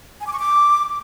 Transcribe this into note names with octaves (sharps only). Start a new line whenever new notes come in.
G#5
D6
C#6
D6